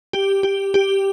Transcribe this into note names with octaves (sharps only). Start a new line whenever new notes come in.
G4
G4
G4